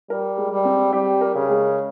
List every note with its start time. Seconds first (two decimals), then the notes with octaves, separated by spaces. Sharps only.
0.10 G3 A#4
0.38 G#3
0.52 G3
0.65 C4
0.93 G3 G4
1.21 A#4
1.35 C#3
1.49 G#3